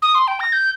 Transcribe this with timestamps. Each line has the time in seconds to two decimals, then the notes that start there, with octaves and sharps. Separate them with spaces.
0.02 D#6
0.15 C6
0.27 G5
0.40 A#6
0.52 G6